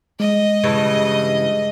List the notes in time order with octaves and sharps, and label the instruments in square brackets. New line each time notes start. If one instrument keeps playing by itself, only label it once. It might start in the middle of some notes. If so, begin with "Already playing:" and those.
[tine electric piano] G#3 [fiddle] D#5
[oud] G2 C#3 E3